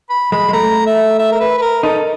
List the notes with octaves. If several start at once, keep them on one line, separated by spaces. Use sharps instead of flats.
B5
G#3 B5
G#3
A3 A#5
E5
E5
A#4
B4
B4
A#4
D#4 A4